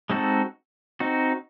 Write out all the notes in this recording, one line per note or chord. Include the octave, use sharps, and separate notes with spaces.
G#3 C4 D#4 F#4 A4
C4 D#4 F#4